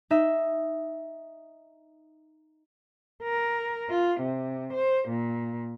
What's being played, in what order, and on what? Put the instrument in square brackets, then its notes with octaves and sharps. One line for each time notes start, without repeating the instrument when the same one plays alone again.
[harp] D#4 E5
[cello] A#4
F4
C3
C5
A#2